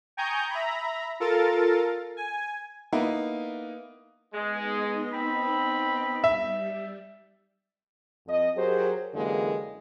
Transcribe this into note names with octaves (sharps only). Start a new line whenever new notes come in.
G5 G#5 A#5 C#6 D#6 G6
E5 A#5 B5
F4 A4 A#4 A6
G#5
A#3 B3 D#4 E4
G#3 B3 D#4 D#5
C4 B5
G3 E5
F2 D#5
F#3 G4 G#4 A#4 C5
F#2 D3 E3 G#3 A#3 G4